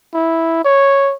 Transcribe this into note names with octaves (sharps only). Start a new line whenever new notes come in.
E4
C#5